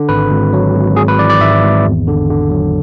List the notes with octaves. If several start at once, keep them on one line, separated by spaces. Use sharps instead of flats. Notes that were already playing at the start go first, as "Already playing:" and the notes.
Already playing: D3
G#1 B4
G#1
F#3
G#1
G#1 G#4
B4
E3 D5
D5
G#2 E5
G#1
E2
D3
D3
F#3